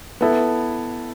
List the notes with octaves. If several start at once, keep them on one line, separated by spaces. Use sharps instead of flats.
B3 E4 A4